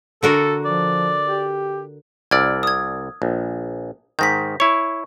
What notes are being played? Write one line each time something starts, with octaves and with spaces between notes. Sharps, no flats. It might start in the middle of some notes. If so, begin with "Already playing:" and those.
D3 F#4 A4 A#4
F3 D5
G4
C2 D5 E6 F6 G#6
D#6 G#6
A#1
G#2 D#3 G6 A#6 B6
E4 C#5 C#6